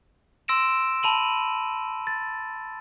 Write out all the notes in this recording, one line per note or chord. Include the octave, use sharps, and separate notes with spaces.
C6 E6 A#6 D7 E7
A5 B5 D#7 F#7
A6